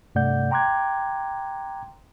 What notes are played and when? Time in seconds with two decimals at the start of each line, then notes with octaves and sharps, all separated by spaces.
0.15 G2 C3 A3 D5 F#5 G6
0.51 G5 A#5 C6 D6 F#6 G#6